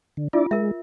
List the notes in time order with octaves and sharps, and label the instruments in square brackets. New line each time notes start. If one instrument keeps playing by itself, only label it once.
[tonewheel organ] D3
[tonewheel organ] D4 E4 D5 [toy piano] F4
[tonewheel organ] G#3 [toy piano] A#4 E5